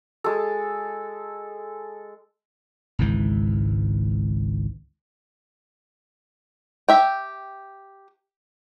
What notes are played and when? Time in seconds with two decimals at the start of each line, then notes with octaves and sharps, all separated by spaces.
0.24 G#3 A4
2.99 G#1 C#2 G#2 E3
6.89 G4 E5 G5